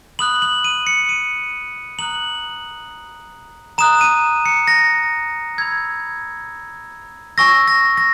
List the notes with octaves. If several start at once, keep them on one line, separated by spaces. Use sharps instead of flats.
B5 D#6 F#6 F#7
F#7
D#7
C#7
D#7
A#5 D#6 F#6 F#7
A#5 D#6 F#6 E7
D#7
C#7
A#6
B5 E6 G#6
G#5 C#6 E6 A#6
A#6
A#6